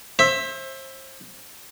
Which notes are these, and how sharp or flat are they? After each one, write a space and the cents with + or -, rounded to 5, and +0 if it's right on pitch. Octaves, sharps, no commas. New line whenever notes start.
C5 +30 E5 +0